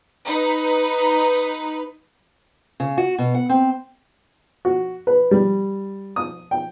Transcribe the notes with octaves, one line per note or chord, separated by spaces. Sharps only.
D#4 B4
C#3
F#4
B2
F#5
C4
F#4
B4
G3
D#6
G5